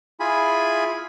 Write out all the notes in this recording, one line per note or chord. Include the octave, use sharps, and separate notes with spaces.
E4 F4 G#4 G#5 B5